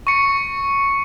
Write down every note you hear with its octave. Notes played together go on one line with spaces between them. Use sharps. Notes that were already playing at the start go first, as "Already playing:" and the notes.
C#6 C#7